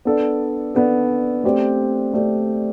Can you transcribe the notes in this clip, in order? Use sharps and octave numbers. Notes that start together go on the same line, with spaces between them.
B3 D4 A4 D5
B3 D4 A4 D5
A3 C4 G4 D5
A3 C4 G4 D5